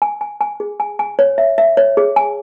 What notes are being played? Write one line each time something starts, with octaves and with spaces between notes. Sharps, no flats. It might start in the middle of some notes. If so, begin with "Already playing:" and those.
G#5
G#5
G#5
G#4
G#5
G#5
C#5
E5
E5
C#5
G#4
G#5